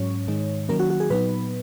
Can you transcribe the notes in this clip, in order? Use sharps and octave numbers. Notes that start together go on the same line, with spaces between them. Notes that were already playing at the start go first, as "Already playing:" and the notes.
Already playing: G#2 F#3 C#4 C#5
G#2 D#3 G#3 D#4
D#3 F#3 A#3 C#4 A#4
F#4
F#4
G#4
A#2 F#3 B3 D#4 B4